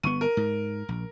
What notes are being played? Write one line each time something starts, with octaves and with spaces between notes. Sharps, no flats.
G1 B3 C#6 D#7
A#4
G#2
A#1